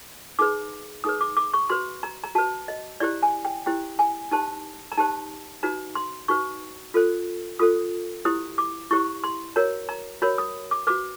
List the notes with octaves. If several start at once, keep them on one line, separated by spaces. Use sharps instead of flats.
D#4 G#4 B4 D6
D#4 G#4 B4 D#6
D6
D6
C#6
F#4 B4 C6
A#5
A#5
F#4 B4 A5
D#5
E4 G4 C5 D5
G#5
G5
E4 G4 C5 G5
G#5
D#4 G4 C5 A5
A#5
D#4 G4 C5 A5
D#4 F#4 B4 A#5
C6
D#4 F#4 B4 C#6
F4 A4 C5
F4 A4 C5 D#6
E4 G4 C5 D#6
D6
E4 G4 C5 C#6
C6
F#4 A#4 C#5 A#5
A#5
F#4 A#4 C#5 B5
D#6
D6
F#4 B4 D6